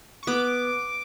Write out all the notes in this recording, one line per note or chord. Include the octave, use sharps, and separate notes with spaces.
C#6
B3 D6